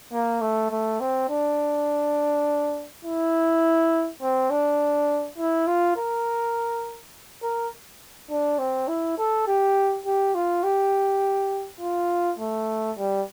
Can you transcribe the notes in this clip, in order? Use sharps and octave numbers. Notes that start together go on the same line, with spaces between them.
A#3
A3
A3
C4
D4
E4
C4
D4
E4
F4
A#4
A#4
D4
C4
E4
A4
G4
G4
F4
G4
F4
A3
G3